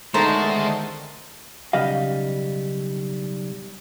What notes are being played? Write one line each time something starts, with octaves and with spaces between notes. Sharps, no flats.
E2 D3 D#3 G#3 A3 A4 C5 A#5
B1 C#3 G3 D#5 F5